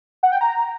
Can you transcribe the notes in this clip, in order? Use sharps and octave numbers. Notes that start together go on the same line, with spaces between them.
F#5
G5
A#5